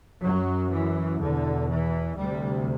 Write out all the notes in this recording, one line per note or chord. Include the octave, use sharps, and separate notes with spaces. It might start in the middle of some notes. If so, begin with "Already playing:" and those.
F#2 F#3
E3
E2 B2 D3
E3
D2 C3 G3